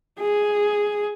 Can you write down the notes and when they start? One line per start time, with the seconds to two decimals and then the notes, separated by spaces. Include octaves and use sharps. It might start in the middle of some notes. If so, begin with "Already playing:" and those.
0.20 G#4